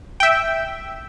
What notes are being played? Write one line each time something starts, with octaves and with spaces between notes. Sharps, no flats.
E5 G5